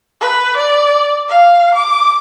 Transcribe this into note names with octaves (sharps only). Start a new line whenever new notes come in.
B4
D5
F5
D6